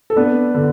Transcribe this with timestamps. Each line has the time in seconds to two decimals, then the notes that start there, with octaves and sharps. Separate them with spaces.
0.10 A4
0.16 B3 D4 B4
0.55 D3